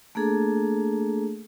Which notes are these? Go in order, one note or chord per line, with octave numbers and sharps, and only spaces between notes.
A3 A#3 D4 G#4 A4